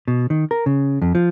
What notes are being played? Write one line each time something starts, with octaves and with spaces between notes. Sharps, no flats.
B2
D#3
A#4
C#3
F2
F3